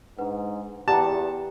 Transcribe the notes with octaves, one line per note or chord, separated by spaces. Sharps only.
G#2 D4 B4 F#5
E2 G4 B4 D5 F#5 A5 A#5